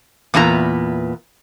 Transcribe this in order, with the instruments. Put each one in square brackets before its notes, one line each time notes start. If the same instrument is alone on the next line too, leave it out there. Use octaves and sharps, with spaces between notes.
[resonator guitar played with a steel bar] E2 A#2 B3 F4 A#5